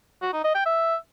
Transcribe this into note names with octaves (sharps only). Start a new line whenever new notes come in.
F#4
D#4
D#5
G5
E5